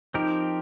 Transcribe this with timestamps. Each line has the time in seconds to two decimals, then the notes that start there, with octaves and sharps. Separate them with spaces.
0.14 F3 C4 D#4 G4 A#4